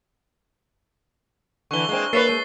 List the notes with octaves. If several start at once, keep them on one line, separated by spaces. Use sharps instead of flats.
D3 E3 C#6 G7
G#3 A#3 C4
A#3 B4 C#5 E5 A6 C7
G#3